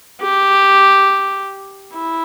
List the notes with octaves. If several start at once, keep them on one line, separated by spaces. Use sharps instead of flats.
G4
E4